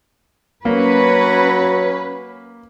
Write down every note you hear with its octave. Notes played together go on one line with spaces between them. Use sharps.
F#3 A#3 C#4 F#4 B4